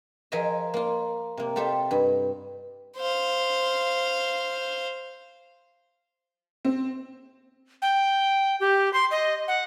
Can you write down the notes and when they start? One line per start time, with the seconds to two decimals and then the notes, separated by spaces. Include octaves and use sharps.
0.32 F3 G#4 A#4 D#5 E5
0.74 A#3 F4
1.37 C3 A#3
1.56 F4 G4 A4 C5 E5
1.91 G2
2.97 C5 F5
6.65 C4
7.82 G5
8.60 G4
8.94 C6
9.11 D#5
9.48 F#5